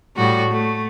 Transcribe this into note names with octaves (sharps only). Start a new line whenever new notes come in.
A2 G3 F#4
A3